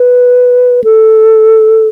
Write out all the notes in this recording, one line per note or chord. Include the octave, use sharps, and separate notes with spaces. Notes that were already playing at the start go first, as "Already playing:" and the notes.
Already playing: B4
A4